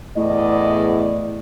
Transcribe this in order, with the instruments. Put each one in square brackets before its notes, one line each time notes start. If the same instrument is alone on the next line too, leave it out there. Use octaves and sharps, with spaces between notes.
[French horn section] E2 D5 D#5 [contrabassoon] A2